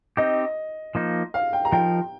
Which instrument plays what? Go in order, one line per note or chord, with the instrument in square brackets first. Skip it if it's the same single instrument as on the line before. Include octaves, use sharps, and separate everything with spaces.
[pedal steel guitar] C4 D#4 G4 [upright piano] D#5
[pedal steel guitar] F3 A#3 D#4
[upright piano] F5
G5
A#5
[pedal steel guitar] F3 D#4 A#4 [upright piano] G5